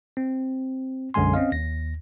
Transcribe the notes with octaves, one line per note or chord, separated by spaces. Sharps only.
C4
B1 F#2 D3 G#3 G#5 C6
C4 C#4 D#5 F5
D#2 A#6